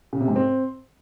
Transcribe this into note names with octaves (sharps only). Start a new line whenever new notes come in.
C#3
C3
G#2
C4